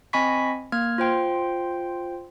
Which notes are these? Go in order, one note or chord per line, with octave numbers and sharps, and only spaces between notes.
C4 D#5 G#5 B5 C#6 B6
A#3 F6 G#6
F4 C5 G5 C6